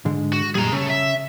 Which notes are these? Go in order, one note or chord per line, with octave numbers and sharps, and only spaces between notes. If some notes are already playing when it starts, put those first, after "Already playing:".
G#2 D3 G#3
F#4
F#2 A#2 G3 G#4 A#5
C#3 A3
E5